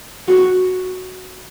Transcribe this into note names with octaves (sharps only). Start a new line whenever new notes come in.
F#4